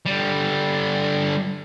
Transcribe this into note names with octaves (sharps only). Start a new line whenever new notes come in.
D3 G3